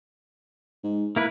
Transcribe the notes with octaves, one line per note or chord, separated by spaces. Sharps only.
G#2
E3 A#3 E4 B4